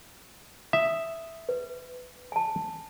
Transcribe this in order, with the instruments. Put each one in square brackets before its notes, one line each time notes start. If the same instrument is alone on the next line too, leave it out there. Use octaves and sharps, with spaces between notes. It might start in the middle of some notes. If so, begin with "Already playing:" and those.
[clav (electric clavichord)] E5 [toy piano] D#6
[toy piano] B4
G#5 A5